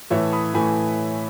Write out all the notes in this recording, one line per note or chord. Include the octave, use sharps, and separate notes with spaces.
A2 E3 A3 C#5 E5
B5 D#6
A2 E3 A3 G#5 B5